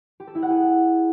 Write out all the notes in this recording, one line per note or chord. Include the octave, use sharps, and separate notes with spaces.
G4
A4
E4
F#5
G#4